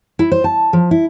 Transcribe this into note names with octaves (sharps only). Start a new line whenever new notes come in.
E4
C5
A5
F3
E4